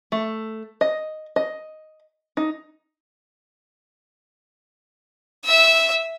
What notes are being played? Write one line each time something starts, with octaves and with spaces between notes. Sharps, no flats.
A3
D#5
D#5
D#4
E5 E6